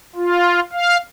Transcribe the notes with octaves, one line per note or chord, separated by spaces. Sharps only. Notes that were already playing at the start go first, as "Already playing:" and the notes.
F4
F5